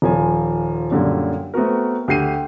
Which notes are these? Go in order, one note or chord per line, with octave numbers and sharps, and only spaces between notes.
D#1 F3 G#5
F#2 A#2 D3 G3
A3 B3 C4 F#4 A#4
D2 G4 C7 D#7